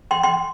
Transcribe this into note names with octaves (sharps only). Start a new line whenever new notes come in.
G5 C6
G5 C6